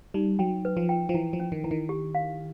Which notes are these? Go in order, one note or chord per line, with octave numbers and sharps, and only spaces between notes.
G3 D#4
F#3 G5
B4
F3
G5
F3
E3 E4
F3
C#4
D#3
E3 E4
D#3
G4
F5